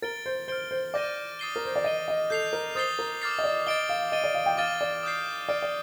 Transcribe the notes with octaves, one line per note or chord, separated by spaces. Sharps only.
A#4 A6 D7 G7
C5
C5 F6 A6 D7 G7
C5
D5 D6 G6 A#6 D#7 G7
D#6 A6 C7 D#7 G7
A#4
C5
D5
D#5 A6 D#7 G7
D#5
A4 G6 C7 F7
A#4
C5 D#6 A6 C7 G7
A#4
D6 F6 A6 C7
D#5
D5
D#5 A6 D7 G7
F5
D#5 A6 D#7 G7
D5
F5
G5
F5 D6 F6 A6 D#7 G7
D5
D#6 G6 C7
D5 F6 A6 D7
D5